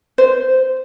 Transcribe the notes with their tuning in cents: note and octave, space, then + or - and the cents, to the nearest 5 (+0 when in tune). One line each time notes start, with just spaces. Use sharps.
C5 -10